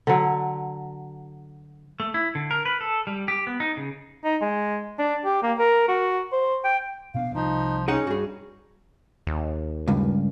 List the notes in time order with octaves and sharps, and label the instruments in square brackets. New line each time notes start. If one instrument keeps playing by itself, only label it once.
[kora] D3 F#3
[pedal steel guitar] A3
E4
D3
A#4
B4
A4
G3
G4
B3
D#4
C#3
[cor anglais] D#4
G#3
D4
G4
A#3
A#4
F#4
C5
G5
[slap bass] B2 B3 D4 [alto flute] F5
[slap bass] C2 [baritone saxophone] F3 [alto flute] D#4
[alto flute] C#4 [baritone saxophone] D#4 [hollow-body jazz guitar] G#4 D#5 F#5
[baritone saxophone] G2 [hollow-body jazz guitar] F#4 G#4
[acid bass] D#2
[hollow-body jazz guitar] C#2 G2